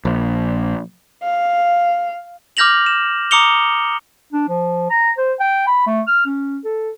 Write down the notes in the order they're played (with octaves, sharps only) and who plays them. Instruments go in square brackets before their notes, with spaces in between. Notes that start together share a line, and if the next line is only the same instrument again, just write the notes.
[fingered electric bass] A#1
[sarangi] F5
[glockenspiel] D6 F6 G6 A#6 F7 F#7
E7
A#5 D6 D#6 C#7 F7 G7
[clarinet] D4
F3
A#5
C5
G5
B5
A3
F6
C#4
A4